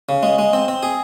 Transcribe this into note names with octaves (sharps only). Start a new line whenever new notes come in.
C#3
G#3
G#3
C4
C4
G#4